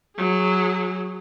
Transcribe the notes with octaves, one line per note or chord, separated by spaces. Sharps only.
F#3 G#4